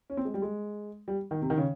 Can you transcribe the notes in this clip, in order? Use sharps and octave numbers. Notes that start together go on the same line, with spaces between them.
C#4
C4
G#3
G3
G#3
G3
D#3
C3
D#3
C#3